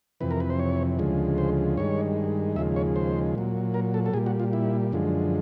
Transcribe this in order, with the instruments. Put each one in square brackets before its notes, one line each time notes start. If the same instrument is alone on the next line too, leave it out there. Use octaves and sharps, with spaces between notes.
[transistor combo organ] F2 C3 E3 B4
A#4
B4
C5
C#5
D2 C#3 F3 G#3
C5
G2 D#3 G#3 C#5
D#2 C#3 F3 G#3 E5
C#5
C5
A#2 F#3
A#4
A4
A4
A#2 G3 G#4
F#4
F4
E4
F#2 D3 F3 G#3